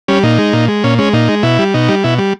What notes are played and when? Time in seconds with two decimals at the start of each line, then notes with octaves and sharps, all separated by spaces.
0.08 G3 C#4
0.23 A#2 D#4
0.38 G#3
0.53 A#2
0.68 G#3
0.84 A#2 C#4
0.98 G#3 C#4
1.13 A#2 D#4
1.28 G#3
1.43 B2 E4
1.59 G3
1.74 B2 D#4
1.89 G3
2.04 B2 E4
2.18 G3